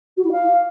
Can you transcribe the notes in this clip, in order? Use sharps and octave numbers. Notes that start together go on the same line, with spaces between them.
F#4
E4
F5